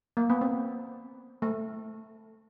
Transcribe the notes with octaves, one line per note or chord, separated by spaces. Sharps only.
A#3
B3
C4
A3